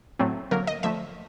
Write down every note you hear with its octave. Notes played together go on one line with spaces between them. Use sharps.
A2 F#3 A3 C4
D3 F#3 A#3 A#4
D#5
D3 F3 A3 E5